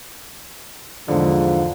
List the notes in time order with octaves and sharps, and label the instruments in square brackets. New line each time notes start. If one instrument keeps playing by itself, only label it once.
[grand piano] E2 G#2 D3 [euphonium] F3